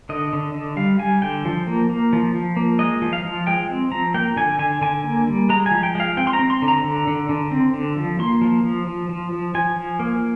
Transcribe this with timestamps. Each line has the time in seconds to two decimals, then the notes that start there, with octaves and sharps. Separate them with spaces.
0.09 D3 D#5
0.33 D3
0.54 D3
0.77 G3 F5
0.99 G3 G#5
1.22 D3 G5
1.45 F3
1.67 A#3
1.90 A#3
2.13 F3
2.34 F3
2.57 A#3
2.79 G#3 D#5
3.02 F3
3.13 F5
3.24 F3
3.47 G#3 G5
3.70 C4
3.91 F3 A#5
4.14 A#3 G5
4.36 D3 G#5
4.59 D3 G#5
4.81 D3 G#5
5.04 A#3
5.27 G3
5.49 G#3 A#5
5.66 G#5
5.72 F3
5.83 G5
5.95 G#3 F5
6.17 C4 G5
6.27 C6
6.33 A#5
6.39 C4
6.50 C6
6.62 D3
6.68 A#5
6.84 D3
7.07 D3
7.29 D3
7.51 C4
7.74 D3
7.97 F3
8.19 A#3 C6
8.41 F3
8.64 F3
8.87 F3
9.09 F3
9.32 F3
9.55 F3 G#5
9.76 F3
9.99 A#3